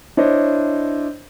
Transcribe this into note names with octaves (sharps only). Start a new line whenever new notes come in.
D4 E4 C5 C#5 D#5